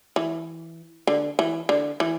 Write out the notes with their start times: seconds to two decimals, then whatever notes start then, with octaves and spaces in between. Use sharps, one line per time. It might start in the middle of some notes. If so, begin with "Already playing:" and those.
0.16 E3
1.07 D3
1.39 E3
1.69 D3
2.00 E3